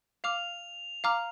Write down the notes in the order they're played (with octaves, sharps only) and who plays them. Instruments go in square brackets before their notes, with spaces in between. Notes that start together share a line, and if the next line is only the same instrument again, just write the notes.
[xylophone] F5 D6 F6 [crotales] F7
[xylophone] F5 A#5 D6 F6